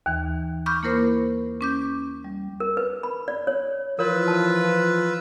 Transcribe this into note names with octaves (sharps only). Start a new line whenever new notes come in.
D#2 E3
B5 C#6 D6 F6 G6
A#3 E4 A#4 C5
C#4 D6 G6
G3
A#4
B4
B5
D5
C#5
E3 F3 F4 A#4 B4 C#5 E6
A5